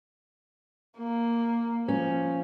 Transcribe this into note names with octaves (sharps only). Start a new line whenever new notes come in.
A#3
F3 C#4